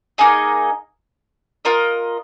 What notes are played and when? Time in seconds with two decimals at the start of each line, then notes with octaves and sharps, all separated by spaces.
0.18 A#3 D#4 G#4 D#5
1.65 F4 A#4 D#5